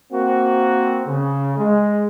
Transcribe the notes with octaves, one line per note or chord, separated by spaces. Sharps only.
A#3 C4 F#4
C#3
G#3